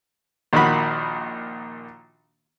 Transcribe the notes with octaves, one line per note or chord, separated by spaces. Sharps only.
A#1 D#3 F#4 B5